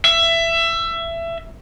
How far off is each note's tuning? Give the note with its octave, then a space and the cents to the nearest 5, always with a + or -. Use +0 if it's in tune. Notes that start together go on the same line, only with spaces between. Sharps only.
E5 +20